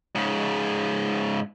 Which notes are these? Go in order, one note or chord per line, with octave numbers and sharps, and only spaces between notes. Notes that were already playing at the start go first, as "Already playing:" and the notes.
G#2 C#3